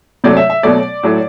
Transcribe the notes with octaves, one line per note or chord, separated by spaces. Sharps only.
C3 F#3 A3 D5
E5
E5
B2 F#3 A3 D5
A2 F#3 A3